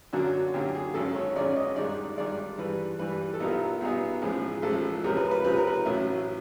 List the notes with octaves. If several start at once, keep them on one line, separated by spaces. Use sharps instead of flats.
F#2 D3 F#3 A#3 F#4
F#2 D3 F#3 A#3 G4
G#4
G#1 F#2 D#3 G#3 C#4 A4
C#5
G#1 F#2 D#3 G#3 C#4 D5
D#5
G2 D#3 G#3 D5
G2 D#3 G#3 D5
G2 E3 G3 B4
G2 E3 G3 B4
A4
B1 A#2 G3 B3 D#4 A#4
B1 A#2 G3 B3 D#4 G#4
A1 A2 F3 G#3 G#4
A1 A2 F3 G#3 A4
C#2 C3 F3 A#4
B4
B4
C#2 C3 F3 B4
A#4
B4
A1 A2 F#3 E5